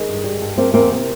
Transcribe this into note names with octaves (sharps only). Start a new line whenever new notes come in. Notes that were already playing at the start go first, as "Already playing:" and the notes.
Already playing: D#3 G#3
G2
G3
G2
F3 A#3 C4
E2 A#3 C4
C3